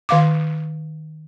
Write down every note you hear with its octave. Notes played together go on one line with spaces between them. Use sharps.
D#3 F5 D6